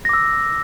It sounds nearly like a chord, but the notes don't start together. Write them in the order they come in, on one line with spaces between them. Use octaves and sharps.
A#6 D6 E6